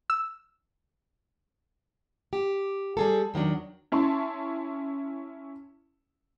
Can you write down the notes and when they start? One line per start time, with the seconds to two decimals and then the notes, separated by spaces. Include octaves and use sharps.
0.10 E6
2.33 G4
2.97 G3 G#4 A4
3.34 E2 D#3 F#3 D4
3.92 C#4 E4 A5 C6